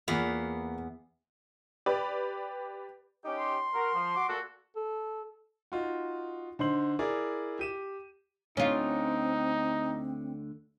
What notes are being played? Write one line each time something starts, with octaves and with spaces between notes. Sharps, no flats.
E2 A#3 B3 F4 F5
G4 B4 D5
C#4 D#4 G4
C6
F#4 A#4
F3
F#4 D6
A#2 F#4 A4
A4
D#4 F4 F#4
D3 D#4 C5 C6 F#7
E4 G#4 A#4 D5
G4 D#7 E7
D2 D3 C4 C#4 D#4 F4